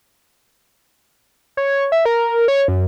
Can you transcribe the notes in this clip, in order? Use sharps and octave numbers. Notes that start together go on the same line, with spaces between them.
C#5
E5
A#4
C#5
F#2